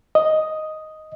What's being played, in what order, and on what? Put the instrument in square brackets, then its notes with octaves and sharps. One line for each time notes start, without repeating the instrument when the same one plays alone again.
[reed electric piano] D#5